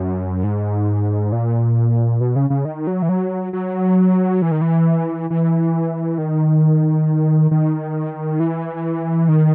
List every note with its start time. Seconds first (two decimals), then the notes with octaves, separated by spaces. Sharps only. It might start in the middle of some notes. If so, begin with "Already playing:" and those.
Already playing: F#2
0.44 G#2
1.32 A#2
2.21 B2
2.36 C#3
2.50 C#3
2.65 D#3
2.87 F#3
3.02 E3
3.09 F#3
3.53 F#3
4.42 E3
4.51 D#3
4.61 E3
5.30 E3
6.18 D#3
7.51 D#3
8.40 E3
9.28 D#3